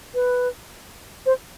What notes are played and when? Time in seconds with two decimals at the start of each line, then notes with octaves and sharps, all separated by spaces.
0.15 B4
1.26 C5